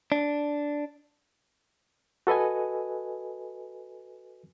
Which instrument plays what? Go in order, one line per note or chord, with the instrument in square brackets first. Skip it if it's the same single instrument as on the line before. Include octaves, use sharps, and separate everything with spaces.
[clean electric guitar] D4
[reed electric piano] F#4 A4 B4 D#5 G#5